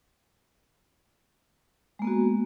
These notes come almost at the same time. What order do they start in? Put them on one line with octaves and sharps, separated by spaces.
G#3 A#3 B3 F#4